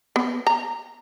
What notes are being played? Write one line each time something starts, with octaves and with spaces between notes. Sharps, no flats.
B3
A#5